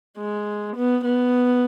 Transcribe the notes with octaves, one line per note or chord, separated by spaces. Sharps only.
G#3
B3
B3